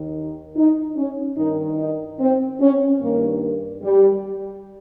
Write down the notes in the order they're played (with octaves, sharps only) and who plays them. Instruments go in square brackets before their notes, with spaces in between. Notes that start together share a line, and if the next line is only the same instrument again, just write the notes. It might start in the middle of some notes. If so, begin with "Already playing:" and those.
Already playing: [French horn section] D#2 D#3
D#4
C#4
G2 D#3 D#4
D#4
C4
C#4
G2 D#3 A#3
G3